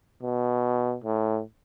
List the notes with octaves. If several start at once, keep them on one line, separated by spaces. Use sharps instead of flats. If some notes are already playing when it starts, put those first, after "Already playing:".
B2
A2